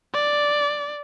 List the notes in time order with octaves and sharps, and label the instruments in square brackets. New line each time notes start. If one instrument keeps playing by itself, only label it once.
[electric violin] D5